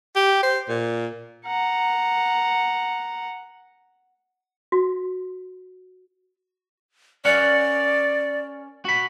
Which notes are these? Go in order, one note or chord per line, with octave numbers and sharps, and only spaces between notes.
G4
C5
A#2
F#5 A#5
F#4
C#4 A#4 D5 F#5
F#4 B5